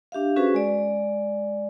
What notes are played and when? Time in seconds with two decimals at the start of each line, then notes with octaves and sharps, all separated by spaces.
0.12 D4 G4 E5 F5
0.36 C#4 F#4 G#4 B4 C5
0.54 G#3 D5